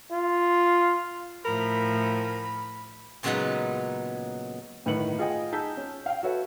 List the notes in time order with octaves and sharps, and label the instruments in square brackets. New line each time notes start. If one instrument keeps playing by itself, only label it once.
[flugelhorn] F4
[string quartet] A2 F3 [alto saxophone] A#4 [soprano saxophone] B5
[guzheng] A#2 C#3 F#3 G#3 B3 D#4
[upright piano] G1 A2 D#3 B4 C#7 F#7
F4 G#4 D#5 F#5 G5
D#4 G#4 A5 E6 G6 B6
C#4
F5 G5
F#4 A4 B4 C#5 E5